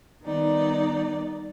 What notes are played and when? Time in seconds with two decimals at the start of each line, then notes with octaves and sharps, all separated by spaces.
0.23 D#3 G3 B3 D#4 D5